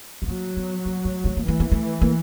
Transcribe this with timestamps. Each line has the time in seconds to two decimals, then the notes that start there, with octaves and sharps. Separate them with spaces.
0.22 A3
0.28 F#3 A#3
0.57 B3
0.85 A#3
1.05 A3
1.24 A3
1.37 A#3
1.44 E3 A3
1.60 A#3
1.72 A3
2.01 A#3